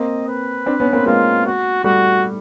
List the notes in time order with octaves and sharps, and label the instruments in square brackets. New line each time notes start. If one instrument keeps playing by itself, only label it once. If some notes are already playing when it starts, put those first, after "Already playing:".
Already playing: [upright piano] A#3 C4 [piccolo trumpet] D#5
[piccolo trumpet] B4
[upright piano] C4 D4
B3 C#4
A#3 C4
[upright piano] G#3 A#3 [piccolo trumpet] F4
[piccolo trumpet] F#4
[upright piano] G3 A3 [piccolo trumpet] F#4